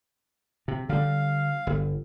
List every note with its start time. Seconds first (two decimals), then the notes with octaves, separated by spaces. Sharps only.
0.68 C3
0.89 D3 G3 F5
1.67 G1